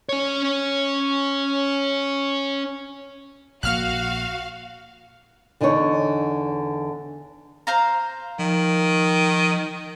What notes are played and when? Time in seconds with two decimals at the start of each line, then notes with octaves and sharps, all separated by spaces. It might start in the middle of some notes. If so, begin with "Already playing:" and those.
0.09 C#4 C#5
3.63 A#1 A#3 F#4 F5 F6 F#6
5.61 E2 D3 D4 D#4 A4 C#5
7.67 C5 F5 A#5
8.39 D#3 F3